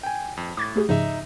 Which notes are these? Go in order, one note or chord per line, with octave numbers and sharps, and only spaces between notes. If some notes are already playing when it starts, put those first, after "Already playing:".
G5 G#5
F2
A2 D6 G#6 A6
A3 G4 G#4
G#2 C#3 F3 D#4 E5